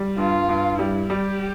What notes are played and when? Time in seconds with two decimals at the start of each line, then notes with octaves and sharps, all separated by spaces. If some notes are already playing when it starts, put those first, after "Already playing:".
Already playing: G3
0.18 G2 F4
0.49 G2
0.79 G3 E4
1.09 G3 G4